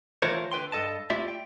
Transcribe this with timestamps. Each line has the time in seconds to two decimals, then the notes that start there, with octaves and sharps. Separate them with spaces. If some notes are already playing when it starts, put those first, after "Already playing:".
0.22 E3 A3 F4 A#4 C5 C#5
0.52 D3 B4 G5 C6
0.72 G2 A4 D#5 A5
1.10 A3 E4 F4 G4 D5 E5
1.28 G5